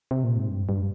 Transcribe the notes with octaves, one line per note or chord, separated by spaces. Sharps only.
C3
A#2
G#2
G2
G2